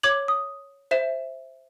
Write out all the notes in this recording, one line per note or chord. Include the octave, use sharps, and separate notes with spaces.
C#5 D6 G#6 F#7
D#6
C5 E5 E7